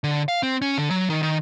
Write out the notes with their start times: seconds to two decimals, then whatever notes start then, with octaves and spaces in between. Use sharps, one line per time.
0.04 D3
0.28 F5
0.43 C4
0.62 C#4
0.78 D3
0.90 F#3
1.10 D#3
1.23 D#3